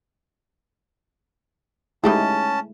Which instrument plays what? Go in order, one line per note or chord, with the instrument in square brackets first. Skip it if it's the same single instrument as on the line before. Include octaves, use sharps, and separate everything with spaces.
[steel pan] G#3 A3 E4 [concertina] C#4 A5 [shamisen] D#4 G4 G#4